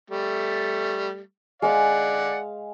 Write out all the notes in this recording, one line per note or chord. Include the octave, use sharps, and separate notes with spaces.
G3 A3
G#3 D5 F5 F#5